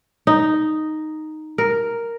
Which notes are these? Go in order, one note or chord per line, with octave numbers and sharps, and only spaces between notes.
D#4
A#4